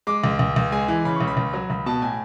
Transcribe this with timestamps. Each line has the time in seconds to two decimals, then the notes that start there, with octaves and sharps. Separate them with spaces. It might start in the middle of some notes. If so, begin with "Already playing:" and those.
0.07 G#3 D6
0.24 C#2
0.39 C#2
0.56 C#2
0.72 G#3 G#5
0.88 E3
1.05 C#3 B5
1.16 C#2 C#6
1.27 B5
1.37 C#2
1.53 F#3
1.70 C#2 B5
1.86 B2 A5
2.02 A2 G#5